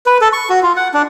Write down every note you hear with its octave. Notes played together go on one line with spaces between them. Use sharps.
B4
A4
C#6
F#4
F4
F#5
D4